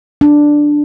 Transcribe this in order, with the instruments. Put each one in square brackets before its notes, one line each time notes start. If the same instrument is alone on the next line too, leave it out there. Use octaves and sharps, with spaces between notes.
[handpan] D4